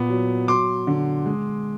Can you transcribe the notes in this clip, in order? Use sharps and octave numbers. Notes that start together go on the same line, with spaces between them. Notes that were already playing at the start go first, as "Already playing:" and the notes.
Already playing: A#2 B3
F#3
F#3 C6 D6
D3
G#3